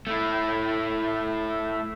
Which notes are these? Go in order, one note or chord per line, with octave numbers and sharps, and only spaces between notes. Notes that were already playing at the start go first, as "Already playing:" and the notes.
A3 E4